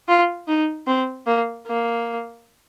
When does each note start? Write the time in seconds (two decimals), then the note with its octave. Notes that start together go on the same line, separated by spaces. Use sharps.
0.08 F4
0.48 D#4
0.87 C4
1.27 A#3
1.67 A#3